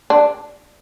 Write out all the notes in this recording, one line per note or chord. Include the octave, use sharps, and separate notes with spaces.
D4